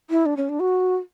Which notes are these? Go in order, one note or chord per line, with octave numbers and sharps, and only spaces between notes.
E4
D4
C#4
D4
F#4